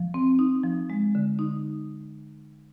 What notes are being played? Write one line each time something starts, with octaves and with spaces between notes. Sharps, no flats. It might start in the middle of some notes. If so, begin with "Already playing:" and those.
Already playing: F3
C4
D#4
F3
G#3
D3
D#4